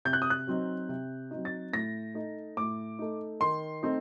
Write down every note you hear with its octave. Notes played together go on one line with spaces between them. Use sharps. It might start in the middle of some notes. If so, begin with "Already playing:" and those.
C3 G6
F#6
D#6
F#6
F#3 C4 D#4
C3
F#3 C4 D#4
A6
A2 A#6
A3 D#4
A2 D6
A3 D#4
D#3 C6
A3 C4 D#4